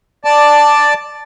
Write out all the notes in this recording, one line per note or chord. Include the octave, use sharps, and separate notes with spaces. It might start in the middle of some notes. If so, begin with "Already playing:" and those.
D5 A5